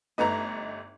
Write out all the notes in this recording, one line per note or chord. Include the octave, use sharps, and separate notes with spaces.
G1 A3 D#4 B4 A#5